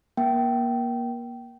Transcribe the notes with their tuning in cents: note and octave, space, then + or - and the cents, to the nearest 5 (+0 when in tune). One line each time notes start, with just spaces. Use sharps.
A#3 +30 G5 -20